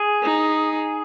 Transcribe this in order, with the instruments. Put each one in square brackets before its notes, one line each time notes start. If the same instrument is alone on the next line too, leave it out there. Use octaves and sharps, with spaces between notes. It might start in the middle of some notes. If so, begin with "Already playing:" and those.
Already playing: [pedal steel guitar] G#4
[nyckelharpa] D#4